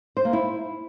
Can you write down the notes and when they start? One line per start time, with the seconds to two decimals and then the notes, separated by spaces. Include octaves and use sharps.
0.17 C5
0.25 A#3
0.33 E4